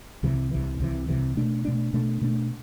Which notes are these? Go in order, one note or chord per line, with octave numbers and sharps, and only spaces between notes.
C2 C3 E3
C2 C3 E3
C2 C3 E3
C2 C3 E3
B2 A3 D4
B2 A3 D4
B2 A3 D4
B2 A3 D4